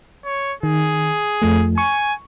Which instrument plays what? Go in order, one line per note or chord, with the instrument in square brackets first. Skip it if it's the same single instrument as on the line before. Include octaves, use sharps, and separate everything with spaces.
[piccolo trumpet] C#5
[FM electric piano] D#3 [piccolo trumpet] G#4
[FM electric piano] F2 F3 A3
[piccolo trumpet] G#5 [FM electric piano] C#6